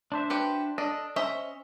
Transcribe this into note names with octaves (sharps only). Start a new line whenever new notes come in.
D4 C5 E5
F#4 G4 B4
D4 A4 D#5
C#4 C5 D#5 E5